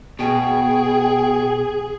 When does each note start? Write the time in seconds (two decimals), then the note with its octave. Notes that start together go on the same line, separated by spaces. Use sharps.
0.19 B2 G#4 G5